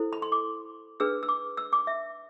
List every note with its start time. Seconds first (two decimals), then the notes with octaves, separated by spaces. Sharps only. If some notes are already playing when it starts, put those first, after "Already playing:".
Already playing: E4 A4 C5
0.13 B5
0.22 C6
0.32 D6
1.00 D4 G#4 B4 E6
1.23 E6
1.28 D6
1.57 E6
1.73 D6
1.87 E5